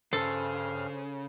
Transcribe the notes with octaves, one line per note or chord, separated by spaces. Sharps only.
G2 C#3 A4 C5 F6